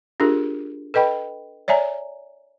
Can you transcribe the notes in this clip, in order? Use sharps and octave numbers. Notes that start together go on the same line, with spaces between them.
D4 F4 G4 G#4 A#4
A4 B4 D#5 G5 B5
C#5 D5 E5 G#5 A#5